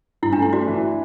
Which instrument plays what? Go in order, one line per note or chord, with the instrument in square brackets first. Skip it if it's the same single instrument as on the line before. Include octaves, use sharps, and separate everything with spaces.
[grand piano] G2 [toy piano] E4
[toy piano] D4
[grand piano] A3 [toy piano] E4
[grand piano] D4 [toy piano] F#4
[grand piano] E3